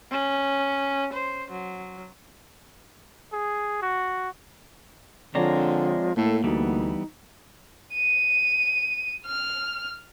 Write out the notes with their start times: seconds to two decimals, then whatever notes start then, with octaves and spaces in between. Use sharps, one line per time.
0.12 C#4
1.13 C5
1.51 F#3
3.33 G#4
3.82 F#4
5.35 D3 F3 G#3 C4 C#5 D5 A#5
6.17 A2 A#3 A4
6.44 D2 E3 G3 B3 D#4
7.94 D#7
9.26 F6